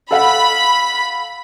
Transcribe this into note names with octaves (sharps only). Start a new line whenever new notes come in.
A4 F5 F#5 B5